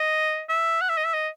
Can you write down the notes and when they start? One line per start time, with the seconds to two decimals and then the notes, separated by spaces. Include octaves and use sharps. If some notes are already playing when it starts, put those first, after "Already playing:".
Already playing: D#5
0.49 E5
0.81 F#5
0.89 E5
0.98 D#5
1.05 E5
1.14 D#5